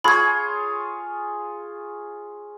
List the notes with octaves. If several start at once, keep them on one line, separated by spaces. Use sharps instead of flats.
F4 G#4 C#5 B5 G#6